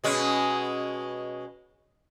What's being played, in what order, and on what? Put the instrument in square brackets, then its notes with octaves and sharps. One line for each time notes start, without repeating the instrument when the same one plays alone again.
[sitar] B2 G#3 C#4